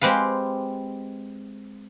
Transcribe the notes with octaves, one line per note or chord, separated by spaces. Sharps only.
G#3 C4 G4 B4 F5